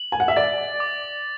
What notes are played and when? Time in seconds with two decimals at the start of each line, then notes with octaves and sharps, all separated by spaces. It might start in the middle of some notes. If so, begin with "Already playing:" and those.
Already playing: F#7
0.12 G#5
0.20 F#5
0.28 E5
0.36 D5 A6
0.80 D6